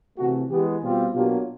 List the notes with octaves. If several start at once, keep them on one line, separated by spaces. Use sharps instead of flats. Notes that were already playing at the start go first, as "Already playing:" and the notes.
C3 E3 A3 F#4
E3 G#3 B3 G4
B2 G3 C4 F4
B2 F#3 A#3 D4 F4 G4